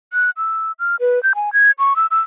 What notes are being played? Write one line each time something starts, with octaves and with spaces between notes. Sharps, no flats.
F#6
E6
F6
B4
G6
G#5
G#6
C#6
E6
E6